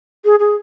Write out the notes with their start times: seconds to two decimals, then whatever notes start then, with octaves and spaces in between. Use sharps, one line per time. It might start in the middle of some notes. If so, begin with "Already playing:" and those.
0.25 G#4
0.40 G#4